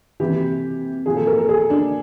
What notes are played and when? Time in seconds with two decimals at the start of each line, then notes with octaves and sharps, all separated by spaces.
0.20 C3 E3 G4
1.06 A#2 F3 G#4
1.17 A4
1.27 A#4
1.38 A4
1.49 G#4
1.70 D4